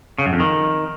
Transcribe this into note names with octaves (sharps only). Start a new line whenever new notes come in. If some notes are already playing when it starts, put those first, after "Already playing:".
C#3
F#2
F2
D#3